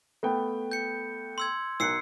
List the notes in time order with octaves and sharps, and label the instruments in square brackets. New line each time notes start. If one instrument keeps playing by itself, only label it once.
[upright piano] A3 B3 G5
[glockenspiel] G6 C#7
C6 E6 G#6
[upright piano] B1 A#4 F#6 [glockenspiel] E6 C7 C#7